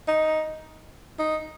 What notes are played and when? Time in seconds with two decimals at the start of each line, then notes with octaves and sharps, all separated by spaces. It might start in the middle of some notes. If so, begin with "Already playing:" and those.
0.08 D#4
1.19 D#4